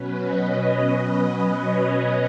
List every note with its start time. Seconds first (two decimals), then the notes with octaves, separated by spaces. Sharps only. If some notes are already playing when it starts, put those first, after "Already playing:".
Already playing: B2 F#3 C#4 B4
0.26 D#5
1.44 C#5